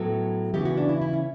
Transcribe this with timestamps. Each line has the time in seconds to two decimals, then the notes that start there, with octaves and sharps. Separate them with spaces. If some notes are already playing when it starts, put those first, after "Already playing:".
Already playing: A2 F#3 B3 A4
0.54 C#3 E3 B3 G4
0.65 F#4
0.77 D4
0.89 E4
1.01 E4
1.13 C#4